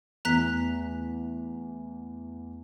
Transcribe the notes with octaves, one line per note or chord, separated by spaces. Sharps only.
E2 A3 B3 G#5 A#5 F#6 B6